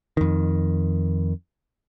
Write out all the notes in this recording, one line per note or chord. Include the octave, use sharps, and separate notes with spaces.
F2 D#3